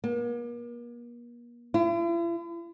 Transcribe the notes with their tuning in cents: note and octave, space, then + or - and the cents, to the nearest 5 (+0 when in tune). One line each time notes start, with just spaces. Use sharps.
A#3 +40
E4 +45